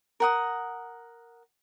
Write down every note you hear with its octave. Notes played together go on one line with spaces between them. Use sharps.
A#4 F#5 D#6